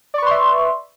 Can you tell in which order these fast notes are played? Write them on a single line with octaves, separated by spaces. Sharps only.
D5 C#6 B4 C6 E5